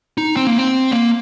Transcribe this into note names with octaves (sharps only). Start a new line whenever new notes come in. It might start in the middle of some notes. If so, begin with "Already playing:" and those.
D#4
C4
A#3
C4
A#3